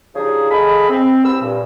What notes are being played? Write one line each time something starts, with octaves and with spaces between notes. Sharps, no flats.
C#3 F3 G3 D4 D#4 G#4
G#4 A4 D#5 F5 B5
C4
C2 B3 C5 B5 E6
G2 A#2